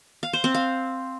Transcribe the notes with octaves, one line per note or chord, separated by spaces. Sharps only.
F5
C5
C4
F5